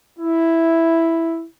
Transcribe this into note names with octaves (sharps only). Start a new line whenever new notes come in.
E4